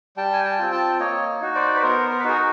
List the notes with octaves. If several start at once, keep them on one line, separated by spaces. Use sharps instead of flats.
G3 G5 A5
G#5
G5 A5
C4 F4
G5 A5
A#3 C#5 D#5
D#4 F#4
C5 D5
B4
B3 A#4 C5
A#4
B4
D#4 F#4 G#4 A#4